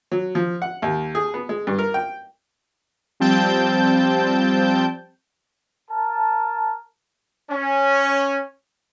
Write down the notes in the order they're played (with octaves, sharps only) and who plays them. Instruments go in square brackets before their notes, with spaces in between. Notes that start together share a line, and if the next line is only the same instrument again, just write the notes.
[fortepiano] F#3
F3
F#5
D#2
G#4
B3
G#3
G2
A#4
G5
[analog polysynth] F3 G3 C4 G5 A5 G6
[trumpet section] A#4 A5
C#4